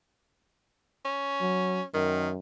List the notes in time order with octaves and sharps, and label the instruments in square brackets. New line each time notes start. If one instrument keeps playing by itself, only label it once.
[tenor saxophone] C#4
[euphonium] F#3
[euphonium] F#2 [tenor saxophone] D#3